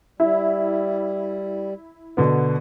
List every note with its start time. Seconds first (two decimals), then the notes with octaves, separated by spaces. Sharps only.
0.20 G3 E4
2.17 B2 D3 B3